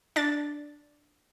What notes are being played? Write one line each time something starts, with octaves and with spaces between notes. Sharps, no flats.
D4 A6